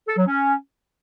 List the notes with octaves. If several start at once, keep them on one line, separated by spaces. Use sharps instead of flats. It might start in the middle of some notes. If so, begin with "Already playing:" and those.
A4
F#3
C#4